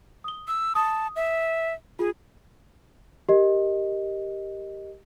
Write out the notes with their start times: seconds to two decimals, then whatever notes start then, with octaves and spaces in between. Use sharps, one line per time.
0.24 D#6 G7
0.48 E6
0.75 A5 D#6
1.16 E5
1.99 F4 G#4
3.29 G4 A#4 D#5